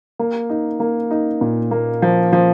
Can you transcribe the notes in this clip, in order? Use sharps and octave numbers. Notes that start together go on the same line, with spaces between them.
A#3
D#4
A#3
D#4
A#2
A#3
F3
F3